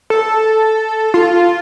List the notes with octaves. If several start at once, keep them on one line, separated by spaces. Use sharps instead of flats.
A4
F4